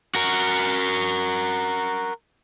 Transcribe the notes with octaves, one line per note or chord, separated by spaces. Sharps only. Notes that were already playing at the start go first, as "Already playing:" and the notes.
F#4 A#4